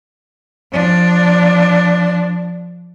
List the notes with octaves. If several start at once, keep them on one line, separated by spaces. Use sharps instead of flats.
F3 D4